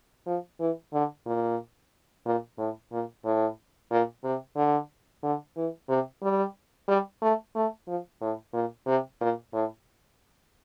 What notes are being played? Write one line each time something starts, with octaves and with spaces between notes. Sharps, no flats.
F3
E3
D3
A#2
A#2
A2
A#2
A2
A#2
C3
D3
D3
E3
C3
G3
G3
A3
A3
F3
A2
A#2
C3
A#2
A2